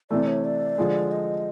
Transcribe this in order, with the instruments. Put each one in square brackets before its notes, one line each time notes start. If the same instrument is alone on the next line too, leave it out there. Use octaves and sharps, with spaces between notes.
[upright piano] C3 E3 A3 [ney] D5
[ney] C#5
D5
[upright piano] D3 F3 G#3
[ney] D#5